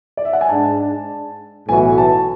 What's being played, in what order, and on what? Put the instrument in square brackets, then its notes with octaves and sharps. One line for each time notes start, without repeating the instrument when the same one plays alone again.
[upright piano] D5
E5
F#5
G#5
[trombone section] G#2 G#3 D4 [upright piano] A5
[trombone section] B1 A2 E3 B3 F#4 [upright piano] G#5
[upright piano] A5